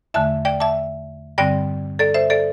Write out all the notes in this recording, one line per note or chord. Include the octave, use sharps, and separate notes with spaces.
E2 D3 A3 E5 A5
D5 G5
E5 A5
G2 D3 G3 C4 D5 G5
A4 D5
C5 E5
A4 D5